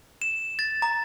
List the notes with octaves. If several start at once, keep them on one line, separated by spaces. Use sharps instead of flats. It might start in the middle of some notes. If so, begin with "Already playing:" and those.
E7
A6
A#5